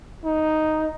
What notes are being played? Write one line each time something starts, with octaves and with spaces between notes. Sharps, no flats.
D#4